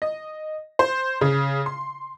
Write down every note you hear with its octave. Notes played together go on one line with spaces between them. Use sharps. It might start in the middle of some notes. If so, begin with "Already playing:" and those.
D#5
C5
C#3
C6